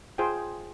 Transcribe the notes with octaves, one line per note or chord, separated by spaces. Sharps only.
F4 G#4 C5 G5